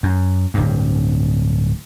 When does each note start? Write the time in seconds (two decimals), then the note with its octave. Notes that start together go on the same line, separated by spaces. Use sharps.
0.03 F#2
0.54 D1 G2